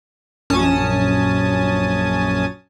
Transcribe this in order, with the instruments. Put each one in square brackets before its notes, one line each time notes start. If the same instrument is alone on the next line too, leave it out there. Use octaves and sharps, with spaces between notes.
[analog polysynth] A#1 F#2 C#4 G#5 A5 D#6